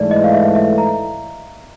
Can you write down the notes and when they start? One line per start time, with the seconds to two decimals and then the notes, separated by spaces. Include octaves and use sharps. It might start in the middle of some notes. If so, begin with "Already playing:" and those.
Already playing: G#2 E3 A3 D5
0.11 D#5
0.24 F5
0.33 E5
0.55 E5
0.78 A#5